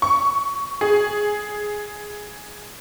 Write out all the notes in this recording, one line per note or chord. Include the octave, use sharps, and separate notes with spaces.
C#6
G#4